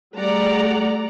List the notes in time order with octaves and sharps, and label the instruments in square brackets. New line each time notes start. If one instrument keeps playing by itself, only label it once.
[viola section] G3 A3 G#4 D5 F#5 A#5